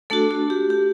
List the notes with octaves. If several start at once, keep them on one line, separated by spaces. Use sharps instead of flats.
A3 D4 F#4 A4
F#4
G4
G4